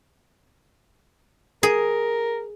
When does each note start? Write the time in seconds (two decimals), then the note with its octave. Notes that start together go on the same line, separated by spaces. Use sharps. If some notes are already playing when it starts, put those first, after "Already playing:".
1.63 G#4 A#4